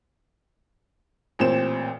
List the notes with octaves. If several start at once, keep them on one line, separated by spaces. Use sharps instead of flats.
A1 A#2 C4 C5 E7